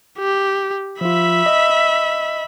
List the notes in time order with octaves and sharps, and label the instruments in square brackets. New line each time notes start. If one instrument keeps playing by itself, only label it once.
[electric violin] G4
[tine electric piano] F3 F4 [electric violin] E5 B5
[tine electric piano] D#5